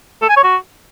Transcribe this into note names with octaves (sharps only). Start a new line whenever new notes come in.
A4
G#5
C#5
F#4